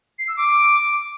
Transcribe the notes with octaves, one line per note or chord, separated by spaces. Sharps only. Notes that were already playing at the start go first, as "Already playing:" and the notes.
C7
E6
D6